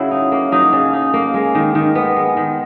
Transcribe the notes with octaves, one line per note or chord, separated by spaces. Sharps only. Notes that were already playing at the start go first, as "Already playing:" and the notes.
Already playing: C#3 F#3 E4
D#4
A#3
F#3 D#4
C#3
D#4
A#3
G#3
D#3
D#3
B3
G#3
D#3